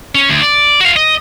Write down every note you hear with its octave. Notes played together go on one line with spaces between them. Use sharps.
C#4
D2
D5
F#4 F5
D#5